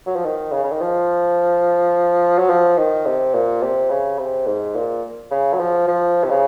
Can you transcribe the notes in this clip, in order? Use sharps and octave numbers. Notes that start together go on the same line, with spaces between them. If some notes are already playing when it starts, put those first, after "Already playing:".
F#3
F3
D#3
C#3
C#3
D#3
F3
F#3
F3
D#3
C3
A#2
C3
C#3
C3
G#2
A#2
C#3
F#3
F3
F3
C3
C#3